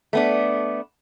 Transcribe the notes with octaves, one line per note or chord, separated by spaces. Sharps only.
A3 B3 D4